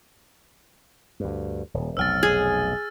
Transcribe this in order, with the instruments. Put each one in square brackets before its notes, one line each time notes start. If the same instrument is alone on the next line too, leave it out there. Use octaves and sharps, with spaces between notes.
[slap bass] D2 G2
D#1
[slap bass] F1 B1 F#3 [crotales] E6 F6 A6
[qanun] G#4